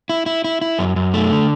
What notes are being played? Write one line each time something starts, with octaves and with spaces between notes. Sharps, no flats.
E4
E4
E4
E4
F#2
F#2
A3
D3